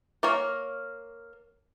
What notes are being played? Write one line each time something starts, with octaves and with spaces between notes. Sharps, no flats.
A#3 A#4 C#5